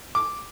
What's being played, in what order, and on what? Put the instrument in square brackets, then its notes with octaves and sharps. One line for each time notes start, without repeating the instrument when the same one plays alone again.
[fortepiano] D6